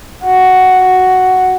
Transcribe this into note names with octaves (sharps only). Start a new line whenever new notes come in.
F#4
F#4